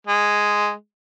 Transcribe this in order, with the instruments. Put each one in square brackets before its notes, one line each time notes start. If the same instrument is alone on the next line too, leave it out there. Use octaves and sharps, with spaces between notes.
[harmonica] G#3